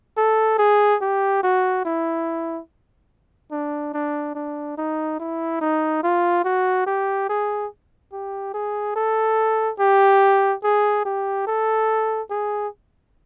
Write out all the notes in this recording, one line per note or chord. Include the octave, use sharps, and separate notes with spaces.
A4
G#4
G4
F#4
E4
D4
D4
D4
D#4
E4
D#4
F4
F#4
G4
G#4
G4
G#4
A4
G4
G#4
G4
A4
G#4